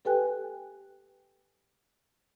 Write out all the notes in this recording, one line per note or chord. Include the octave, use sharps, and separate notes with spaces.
G4 A4 B4 G5 G#5 F#6